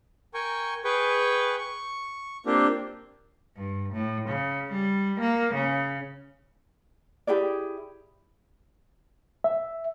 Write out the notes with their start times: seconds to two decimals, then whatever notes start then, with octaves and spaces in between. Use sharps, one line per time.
0.34 A#4 G5 G#5 C#6
0.84 G#4 B4 G5 C#6
1.57 C#6
2.46 A#3 C4 D4 F4 G4
3.56 G2
3.93 A2
4.29 C#3
4.72 G3
5.20 A#3
5.54 C#3
7.27 E4 G4 G#4 D5
9.44 E5